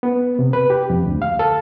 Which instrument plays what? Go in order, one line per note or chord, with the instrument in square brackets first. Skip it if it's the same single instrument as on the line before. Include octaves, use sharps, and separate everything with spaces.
[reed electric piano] B3
C3
B4
G4
F2
D2
F5
A4